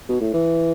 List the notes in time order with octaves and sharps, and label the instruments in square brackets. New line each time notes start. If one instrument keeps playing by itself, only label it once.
[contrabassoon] B2
A2
E3